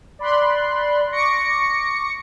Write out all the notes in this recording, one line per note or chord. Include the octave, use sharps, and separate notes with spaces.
D5 B5 C6 F#6
C#6 D6 A#6 C#7